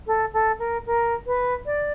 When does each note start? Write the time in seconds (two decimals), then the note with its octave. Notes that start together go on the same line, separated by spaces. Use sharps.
0.07 A4
0.33 A4
0.59 A#4
0.86 A#4
1.27 B4
1.66 D5